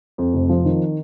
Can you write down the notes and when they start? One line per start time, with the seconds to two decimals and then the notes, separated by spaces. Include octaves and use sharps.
0.18 F2
0.34 F1
0.49 F3
0.64 D#3